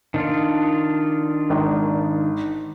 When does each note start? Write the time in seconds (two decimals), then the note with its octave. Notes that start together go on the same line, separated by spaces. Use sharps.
0.14 D#3 D4 F4
1.50 G#1